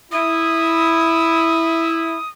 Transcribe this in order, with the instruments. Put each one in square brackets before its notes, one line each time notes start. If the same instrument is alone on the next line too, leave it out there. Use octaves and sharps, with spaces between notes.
[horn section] E4 [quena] D#6